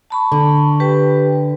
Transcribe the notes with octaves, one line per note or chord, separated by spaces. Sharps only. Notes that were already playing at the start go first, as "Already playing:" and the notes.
A5 B5 C#6
D3
G4 B4 G5